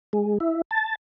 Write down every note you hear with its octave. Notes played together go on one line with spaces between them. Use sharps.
G#3
E4
A5